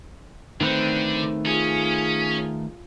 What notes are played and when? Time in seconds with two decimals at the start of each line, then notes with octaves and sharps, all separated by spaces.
0.61 D3 D#3 A3 C4 B4
1.46 C#4 F4 G#4